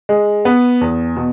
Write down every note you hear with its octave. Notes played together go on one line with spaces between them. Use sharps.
G#3
B3
E2
B2